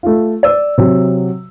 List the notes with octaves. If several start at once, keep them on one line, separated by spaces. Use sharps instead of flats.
A3 F4
D5 E6
C3 F#3